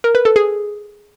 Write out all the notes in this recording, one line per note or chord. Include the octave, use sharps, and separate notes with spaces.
A#4
B4
A4
G#4